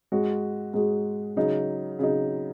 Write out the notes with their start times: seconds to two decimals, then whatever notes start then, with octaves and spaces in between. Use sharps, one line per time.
0.12 G#2 G#3 F#4
0.74 G#2 G#3 F#4
1.37 C#3 F#3 D#4
1.99 C#3 F#3 D#4